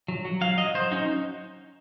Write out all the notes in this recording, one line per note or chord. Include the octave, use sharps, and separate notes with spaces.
F#3
F#3
F#3 F5
F#3 D#5
F#3 C5
C#4 D#4